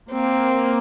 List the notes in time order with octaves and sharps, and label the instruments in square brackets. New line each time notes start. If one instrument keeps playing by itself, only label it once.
[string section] A#3 [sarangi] C4